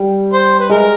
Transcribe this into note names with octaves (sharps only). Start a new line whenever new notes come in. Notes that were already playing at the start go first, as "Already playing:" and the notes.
Already playing: G3
C5
B4
G#3 A#4